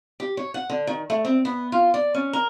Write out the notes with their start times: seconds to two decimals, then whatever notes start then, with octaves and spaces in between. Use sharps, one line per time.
0.20 G4
0.37 C#5
0.54 F#5
0.70 D3
0.87 D#3
1.10 A3
1.25 C4
1.45 B3
1.72 F4
1.94 D5
2.15 C#4
2.33 A#4